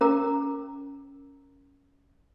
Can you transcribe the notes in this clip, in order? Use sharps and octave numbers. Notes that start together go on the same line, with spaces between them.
C#4 A#4 A#5 D6